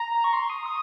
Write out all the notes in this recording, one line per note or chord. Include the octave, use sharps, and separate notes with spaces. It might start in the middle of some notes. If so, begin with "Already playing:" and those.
Already playing: A#5
C#6
C6
D#6
D#6